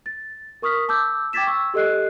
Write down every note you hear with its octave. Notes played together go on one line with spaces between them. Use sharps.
A6
A#4 C#6 D#6 F6 B6
A5 D6 E6 G6
G5 D6 G#6 A6 B6 E7
C#6 E6
G4 A4 D#5 F#6 C7